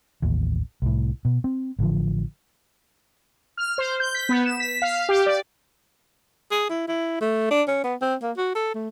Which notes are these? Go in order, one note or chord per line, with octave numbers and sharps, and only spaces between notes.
A1 D#2
C2 A2
B2
C4
A1 D3 F3
F6
C5
G6
B6
B3
E7
B6
F5
G4
D5
G#4
E4
E4
A3
D4
C#4
B3
C4
A#3
F#4
A4
A3